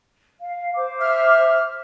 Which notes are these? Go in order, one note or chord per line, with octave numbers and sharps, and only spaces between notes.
F5
C5 D6
E5 F6